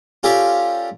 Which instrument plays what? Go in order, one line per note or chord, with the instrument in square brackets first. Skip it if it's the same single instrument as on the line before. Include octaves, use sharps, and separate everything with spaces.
[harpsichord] C#4 F4 G4 A4 A#4 D5